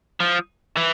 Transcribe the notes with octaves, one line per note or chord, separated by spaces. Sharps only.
F3
E3